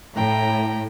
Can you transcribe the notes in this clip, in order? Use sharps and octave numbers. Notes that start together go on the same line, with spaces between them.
A2 G5 A#5